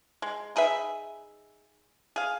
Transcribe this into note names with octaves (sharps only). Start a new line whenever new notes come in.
G#3
D#4 G#4 B4 E5
G#4 F5